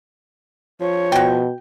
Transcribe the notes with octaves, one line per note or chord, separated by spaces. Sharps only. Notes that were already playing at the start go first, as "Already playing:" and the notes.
F3 C#5
B2 F#4 G5